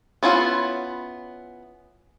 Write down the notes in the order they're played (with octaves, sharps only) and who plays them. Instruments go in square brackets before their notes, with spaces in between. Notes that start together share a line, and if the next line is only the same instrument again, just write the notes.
[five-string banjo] B3 C#4 E4 F4 F#5